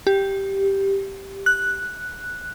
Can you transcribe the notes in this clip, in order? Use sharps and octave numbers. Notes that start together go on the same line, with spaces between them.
G4
F#6